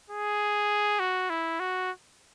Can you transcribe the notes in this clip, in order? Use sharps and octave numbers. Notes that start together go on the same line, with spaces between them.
G#4
F#4
E4
F#4